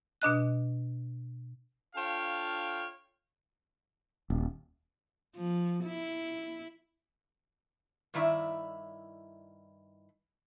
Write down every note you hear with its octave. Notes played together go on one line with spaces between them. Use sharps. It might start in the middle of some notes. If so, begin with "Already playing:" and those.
B2 D4 D#5 F#6
D4 F4 A4 C#5 F5 G5
D#1
F3
E4
G2 D#3 E4 D5 E5